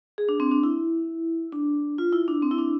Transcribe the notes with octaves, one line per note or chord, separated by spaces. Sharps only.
G#4
D4
C4
D4
E4
D4
F4
E4
D4
C4
E4
D4